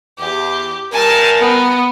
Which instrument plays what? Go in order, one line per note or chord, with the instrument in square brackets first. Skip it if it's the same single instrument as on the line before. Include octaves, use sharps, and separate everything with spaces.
[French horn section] E2 [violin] G4
[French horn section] G2 A#4 [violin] G#5 A5
[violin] B3